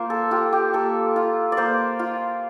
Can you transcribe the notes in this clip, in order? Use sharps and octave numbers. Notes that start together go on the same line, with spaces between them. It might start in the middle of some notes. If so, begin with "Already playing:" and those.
Already playing: A#3 F4 C5
A4
F4 G4
G4
A#3 A4
F4
D5
A#3 C5
F4